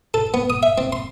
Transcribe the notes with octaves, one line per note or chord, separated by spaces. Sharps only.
A4
B3
D#6
E5
C4
C6